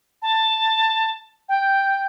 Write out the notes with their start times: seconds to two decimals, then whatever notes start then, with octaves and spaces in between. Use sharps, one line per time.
0.22 A5
1.49 G5